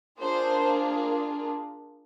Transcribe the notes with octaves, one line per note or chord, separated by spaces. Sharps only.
A#3 D4 F4 G#4 C5